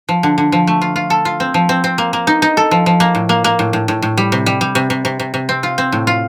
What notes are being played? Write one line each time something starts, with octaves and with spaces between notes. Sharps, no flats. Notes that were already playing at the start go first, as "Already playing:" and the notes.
F3
D3
D3
F3
A3
F4
F4
A4
F4
C4
F3
C4
C4
A#3
A#3
D#4
D#4
A4
F3
F3
A#3
A2
A#3
A#3
A2
A2
A2
A2
G3
C3
G3
G3
C3
C3
C3
C3
C3
C4
F4
C4
A2
F4